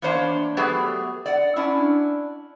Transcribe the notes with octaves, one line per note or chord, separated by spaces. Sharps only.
E2 A#3 D4 C5 C#5
F#3 A3 B3 G4 G#4 B4
D5 F#5
C#4 D4 E4